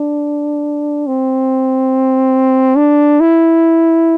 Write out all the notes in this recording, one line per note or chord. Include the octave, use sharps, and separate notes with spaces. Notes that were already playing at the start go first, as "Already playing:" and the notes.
Already playing: D4
C4
D4
E4